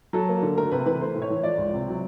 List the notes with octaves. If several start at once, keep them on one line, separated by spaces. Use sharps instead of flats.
F#3 A4
A#3
D3
A3 A#4
C3 B4
E3 B4
A3 C5
A2
C#5
E3
F3 D5
C#2
C3
F#3